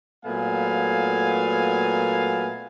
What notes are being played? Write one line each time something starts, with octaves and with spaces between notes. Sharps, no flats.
A#2 F#3 A3 B3 F5 G#5